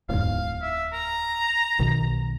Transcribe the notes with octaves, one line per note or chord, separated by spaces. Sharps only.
D1 E2 G#2 F5
E5
A#5
B1 B2 D#3